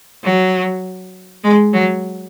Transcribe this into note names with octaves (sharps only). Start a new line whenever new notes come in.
F#3
G#3
F#3